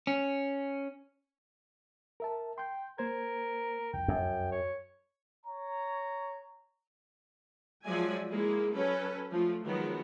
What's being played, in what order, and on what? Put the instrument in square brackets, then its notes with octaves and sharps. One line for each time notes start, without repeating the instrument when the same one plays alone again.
[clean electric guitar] C#4
[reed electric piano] A#4 E5 A5
[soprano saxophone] G5 [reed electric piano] C6 G6
[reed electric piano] A#3 C5 G#6 [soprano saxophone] A#4
[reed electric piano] C2 F2 [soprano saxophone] G5
[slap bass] F#2
[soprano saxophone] C#5
[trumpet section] C#5 A#5
[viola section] F3 F#3 G#3 D5 E5 G#5
G#3 A#3 E4 G#4
F#3 C#4 A4 B4
F3 A3
D#3 F3 F#3 G#3 B3